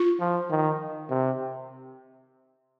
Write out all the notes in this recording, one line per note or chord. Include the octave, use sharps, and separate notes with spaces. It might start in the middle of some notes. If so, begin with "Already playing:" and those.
Already playing: F4
F3
D#3
C3